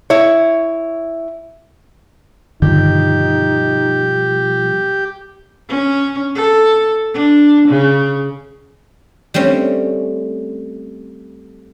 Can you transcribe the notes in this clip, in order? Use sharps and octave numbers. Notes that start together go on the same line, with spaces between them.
E4 C#5
G2 B2 D3 D#3 F3 G3 D#4 G4
C#4
A4
D4
C#3
G3 A3 C4 C#4